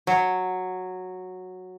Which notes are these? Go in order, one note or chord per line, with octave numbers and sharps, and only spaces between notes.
F#3